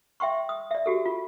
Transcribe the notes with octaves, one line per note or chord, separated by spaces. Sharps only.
E5 G5 C6 C#6
D#6
D5 E5
F#4 G4 A4
F4